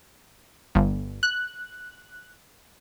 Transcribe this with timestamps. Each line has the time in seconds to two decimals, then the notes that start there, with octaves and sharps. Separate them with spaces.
0.75 G1
1.23 F#6